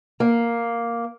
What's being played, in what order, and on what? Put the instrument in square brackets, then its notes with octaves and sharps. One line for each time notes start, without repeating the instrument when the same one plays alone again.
[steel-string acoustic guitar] A#3